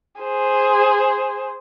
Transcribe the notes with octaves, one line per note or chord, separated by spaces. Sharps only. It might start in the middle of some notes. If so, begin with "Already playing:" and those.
G#4 C5